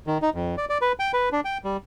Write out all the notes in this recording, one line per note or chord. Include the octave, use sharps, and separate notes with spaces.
D#3
D#4
F2
D5
D5
B4
G5
B4
D4
G5
G3